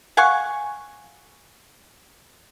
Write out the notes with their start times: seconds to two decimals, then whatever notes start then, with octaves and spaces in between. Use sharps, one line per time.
0.17 F5 F#5 G#5 C#6